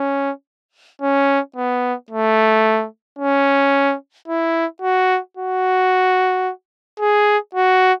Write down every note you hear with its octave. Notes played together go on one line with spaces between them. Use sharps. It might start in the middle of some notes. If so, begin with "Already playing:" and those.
Already playing: C#4
C#4
B3
A3
C#4
E4
F#4
F#4
G#4
F#4